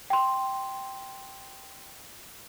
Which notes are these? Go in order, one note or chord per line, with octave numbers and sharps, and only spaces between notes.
G5 C6